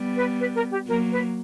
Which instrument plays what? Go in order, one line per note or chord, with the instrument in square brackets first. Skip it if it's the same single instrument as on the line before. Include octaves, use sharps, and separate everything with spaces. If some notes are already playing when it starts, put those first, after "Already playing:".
Already playing: [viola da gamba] G3 B3
[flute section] B4
B4
A#4
G4
[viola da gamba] F#3 A#3 [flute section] A#4
[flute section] B4